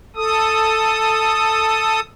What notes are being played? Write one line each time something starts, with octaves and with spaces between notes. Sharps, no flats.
A4 D#6